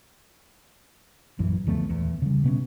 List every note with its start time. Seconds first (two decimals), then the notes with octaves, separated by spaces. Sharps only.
1.39 A#1 F#2 E3
1.67 D2 F3 A3 B3
1.89 D#1 E2
2.22 C#3 G3
2.44 B2 B3 C#4